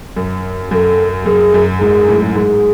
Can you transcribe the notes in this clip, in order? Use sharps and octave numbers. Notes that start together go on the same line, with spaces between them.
F#2
F#2 A4
F#2 G#4
F#2
G#2 G#4
A2
G#2 G#4